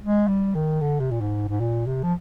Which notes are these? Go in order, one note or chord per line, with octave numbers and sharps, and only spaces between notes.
G#3
G3
D#3
D3
C3
A#2
G#2
G#2
A#2
C3
F3